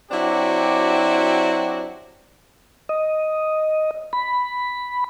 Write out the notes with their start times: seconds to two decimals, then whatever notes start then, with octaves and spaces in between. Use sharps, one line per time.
0.11 F#3 C4 D4 E4 F#4 G4
2.89 D#5
4.13 B5